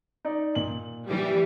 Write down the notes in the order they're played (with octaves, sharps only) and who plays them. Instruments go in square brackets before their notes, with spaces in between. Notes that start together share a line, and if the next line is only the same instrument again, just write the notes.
[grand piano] D#4 D5
A#2 F#7
[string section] E3 G3